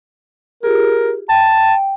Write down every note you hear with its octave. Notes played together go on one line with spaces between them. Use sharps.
F4 G4 G#4 A#4
G5 A5